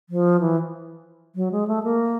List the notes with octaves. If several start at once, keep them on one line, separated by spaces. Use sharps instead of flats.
F3
E3
F#3
G#3
A3
A#3